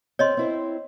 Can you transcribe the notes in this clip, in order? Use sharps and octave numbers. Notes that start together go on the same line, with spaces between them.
C4 C#4 C#5 D#5 C6
C4 E4 C5